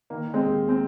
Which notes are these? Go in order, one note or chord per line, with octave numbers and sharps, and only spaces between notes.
D#3 A#3
D#3
G#3 C4
D#2
C4